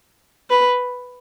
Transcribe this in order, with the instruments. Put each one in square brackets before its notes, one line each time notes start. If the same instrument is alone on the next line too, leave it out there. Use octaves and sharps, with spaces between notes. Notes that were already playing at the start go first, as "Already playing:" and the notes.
[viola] B4